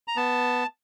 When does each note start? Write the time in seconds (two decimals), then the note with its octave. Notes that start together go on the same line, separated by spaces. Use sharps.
0.08 A#5
0.16 B3 A5